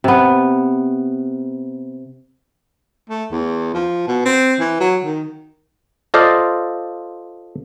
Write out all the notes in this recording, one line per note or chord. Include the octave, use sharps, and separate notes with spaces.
C3 B3
A3
E2
F3
B2
C4
E3
F#3
D#3
F4 A4 C5 D5 D#5 F5